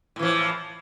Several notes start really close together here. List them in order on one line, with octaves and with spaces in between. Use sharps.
A2 E3 F3